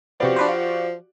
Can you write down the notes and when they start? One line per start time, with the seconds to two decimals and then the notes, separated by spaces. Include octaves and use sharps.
0.20 C3 F3 B3 F#4 G4 D5
0.36 D4 B4 C5
0.49 F4